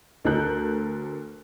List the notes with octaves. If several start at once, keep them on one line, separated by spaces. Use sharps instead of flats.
D2 A4 A#4 F#6 G6